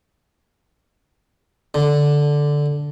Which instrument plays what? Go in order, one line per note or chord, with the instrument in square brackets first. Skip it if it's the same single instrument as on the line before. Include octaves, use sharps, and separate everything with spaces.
[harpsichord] D3